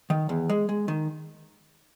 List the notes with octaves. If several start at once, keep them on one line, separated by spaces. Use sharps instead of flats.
D#3
E2
G#3
G#3
D#3